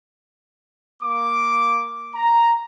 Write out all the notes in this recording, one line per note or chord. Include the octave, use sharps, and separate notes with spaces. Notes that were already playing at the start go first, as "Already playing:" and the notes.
A#3 D6
A#5